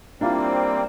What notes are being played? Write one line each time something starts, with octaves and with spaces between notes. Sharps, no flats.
G3 A#3 C4 D4 E4 F4